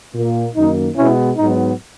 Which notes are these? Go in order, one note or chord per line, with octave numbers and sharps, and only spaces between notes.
A#2 A#3
F#2 D#3 A#3 D#4
B2 G#3 B3 C#4 E4
G#2 F#3 B3 D#4